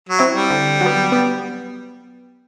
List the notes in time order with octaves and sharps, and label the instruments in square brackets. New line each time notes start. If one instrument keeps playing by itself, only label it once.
[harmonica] F#3
[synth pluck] C4 E4
[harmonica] G3
[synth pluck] D3
F#3 B3
B3